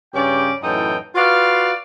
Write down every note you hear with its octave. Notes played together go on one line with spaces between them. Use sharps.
G2 C#3 C#4 D5 G5
F#2 A2 E3 D#4 A4 G5
F4 F#4 B4 D5 F5